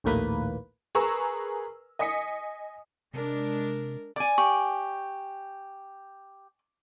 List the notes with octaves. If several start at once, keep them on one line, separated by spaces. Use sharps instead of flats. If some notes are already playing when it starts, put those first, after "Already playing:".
A#1 D#2 A2 A#3 B4
G#4 A#4 B4 A#5 C#6 E6
D#5 G#5 D#6 B6 C#7
C3 G#3 D4 A#4
D5 G#5 D6
G4 C#6